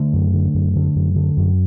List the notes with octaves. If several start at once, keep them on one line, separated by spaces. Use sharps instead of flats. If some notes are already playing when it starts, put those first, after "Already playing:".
Already playing: D3 A3
F#2
D3
F#2
D3
F#2
D3
F#2